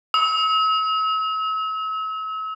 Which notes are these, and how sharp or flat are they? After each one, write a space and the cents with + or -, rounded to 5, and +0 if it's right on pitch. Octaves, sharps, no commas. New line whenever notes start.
E6 -40